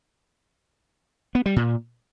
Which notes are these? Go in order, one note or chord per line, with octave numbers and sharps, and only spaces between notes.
B3
G3
A#2